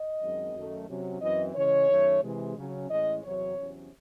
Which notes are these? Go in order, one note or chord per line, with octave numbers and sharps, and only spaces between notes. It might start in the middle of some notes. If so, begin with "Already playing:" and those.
Already playing: D#5
F#2 D#3 G#3 C4
F#2 D#3 A3
C3 F#3 C#4
F#2 E3 C4 D#5
C#3 E3 G#3 C#4 C#5
F#2 D#3 A3 C#4
C3 E3 G#3
C#3 F#3 C#4
A2 E3 G#3 C#4 D#5
E2 C3 F#3 C#5
E2 C3 F#3 C#4